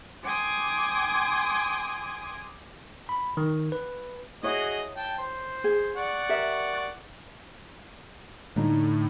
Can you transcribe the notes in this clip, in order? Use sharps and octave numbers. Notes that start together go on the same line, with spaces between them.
G5 G#5 C6 D6 D#6 G#6
B5
D#3
B4
E4 F#4 G#4 C#5 D#5
G5 A5
C5
G#4
D5 F#5 C#6
G4 A#4 E5
A2 D3 A3 D#4